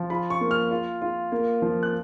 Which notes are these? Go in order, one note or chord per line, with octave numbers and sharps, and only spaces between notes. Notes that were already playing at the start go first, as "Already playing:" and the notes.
Already playing: F3
F4 B5
C#6
A#3
F6
F4
F4
A#3
F3
F#6